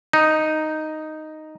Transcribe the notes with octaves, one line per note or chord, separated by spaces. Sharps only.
D#4